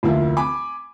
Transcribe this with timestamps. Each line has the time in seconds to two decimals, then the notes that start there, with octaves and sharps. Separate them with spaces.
0.03 F1 D2 A#3 E4 F4
0.37 G#5 B5 D6